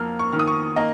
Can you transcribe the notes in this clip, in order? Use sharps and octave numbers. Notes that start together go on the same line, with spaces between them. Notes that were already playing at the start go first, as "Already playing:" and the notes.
Already playing: F2 A#3 F6
C#6
D#3 F6
D#6
C#6
A#3 D#5